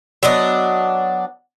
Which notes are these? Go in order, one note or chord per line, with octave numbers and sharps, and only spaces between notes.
F#3 B3 D4 D#5